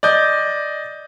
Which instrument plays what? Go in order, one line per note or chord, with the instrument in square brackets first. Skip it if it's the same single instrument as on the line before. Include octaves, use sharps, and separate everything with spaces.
[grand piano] D5 D#5 G6